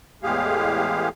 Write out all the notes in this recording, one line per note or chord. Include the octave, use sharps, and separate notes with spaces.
E2 A2 G#3 G4 G#4 F5